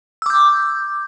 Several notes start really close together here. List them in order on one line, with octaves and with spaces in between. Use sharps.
E6 D6 G6